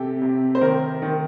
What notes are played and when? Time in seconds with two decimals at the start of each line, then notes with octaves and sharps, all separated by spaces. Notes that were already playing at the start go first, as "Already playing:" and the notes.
Already playing: C3 G4 A4
0.22 C3
0.55 C5
0.61 D#3 A#4
1.02 D#3